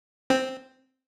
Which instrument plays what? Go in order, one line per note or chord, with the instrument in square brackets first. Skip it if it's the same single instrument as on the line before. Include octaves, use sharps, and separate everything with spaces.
[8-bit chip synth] C4